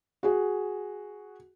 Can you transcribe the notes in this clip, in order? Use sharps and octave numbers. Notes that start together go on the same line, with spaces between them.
F#4 G#4